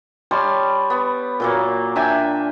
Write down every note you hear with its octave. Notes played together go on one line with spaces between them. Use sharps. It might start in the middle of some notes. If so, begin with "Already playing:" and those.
G3 C#5 A5 C6
B3
A#2 F#3 A#3
D4 E5 G5 G#5